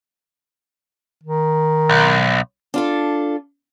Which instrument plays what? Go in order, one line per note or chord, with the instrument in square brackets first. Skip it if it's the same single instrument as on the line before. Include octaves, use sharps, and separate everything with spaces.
[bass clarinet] D#3
[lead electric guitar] B1
[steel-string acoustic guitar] D4 F4 A4